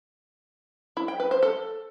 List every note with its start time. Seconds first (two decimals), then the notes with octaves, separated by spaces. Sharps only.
0.97 E4
1.08 G5
1.20 B4
1.31 C5
1.43 A4